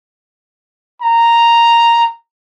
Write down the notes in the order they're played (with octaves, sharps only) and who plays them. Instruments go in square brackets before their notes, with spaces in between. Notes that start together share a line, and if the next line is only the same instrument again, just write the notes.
[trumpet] A#5